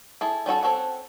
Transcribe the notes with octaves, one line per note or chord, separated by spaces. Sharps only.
E4 G#4 A4
G3 C#4 F#4 A4
C4 A4 C#5 F#5